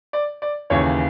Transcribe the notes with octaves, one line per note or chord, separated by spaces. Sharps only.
D5
D5
D#2 C#3 E3 C#5